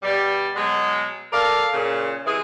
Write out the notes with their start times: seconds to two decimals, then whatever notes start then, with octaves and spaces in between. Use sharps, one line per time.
0.03 B2 G3
0.56 B2 F#3 G#3
1.33 A4 A#4 D5 F5
1.73 A#2 C#3
2.26 C3 E3 G#3 G#4